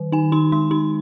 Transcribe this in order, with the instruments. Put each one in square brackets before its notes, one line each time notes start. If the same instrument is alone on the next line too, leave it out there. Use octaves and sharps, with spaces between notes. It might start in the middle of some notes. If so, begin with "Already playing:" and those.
Already playing: [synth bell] D#3
D#4 G#5
D#4 C6
G#3 C6
D#4 C6